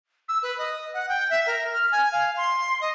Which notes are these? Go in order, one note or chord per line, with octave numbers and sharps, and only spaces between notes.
E6
B4
D#5
F#5
G5
E5
A#4
F6
G#5
F5
C6
D#5